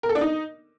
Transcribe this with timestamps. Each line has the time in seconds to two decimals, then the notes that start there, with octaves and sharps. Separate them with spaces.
0.03 A#4
0.09 A4
0.15 D4
0.21 D#4